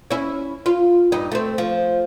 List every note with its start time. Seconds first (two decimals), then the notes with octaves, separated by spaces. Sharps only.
0.11 C#4 E4
0.66 F4
1.12 G2 D#4
1.32 A3 C4
1.58 F3